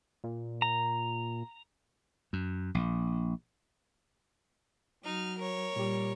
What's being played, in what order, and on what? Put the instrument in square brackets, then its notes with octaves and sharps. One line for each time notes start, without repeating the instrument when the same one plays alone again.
[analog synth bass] A#2
[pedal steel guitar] A#5
[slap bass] F#2
A#1
[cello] F#3 [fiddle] D#4 F6
[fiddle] A#4 C#5
[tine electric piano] A#2 G4 [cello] G3